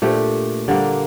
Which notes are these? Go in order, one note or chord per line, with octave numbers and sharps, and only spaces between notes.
A#2 A3 D4 G4
D3 G3 A#3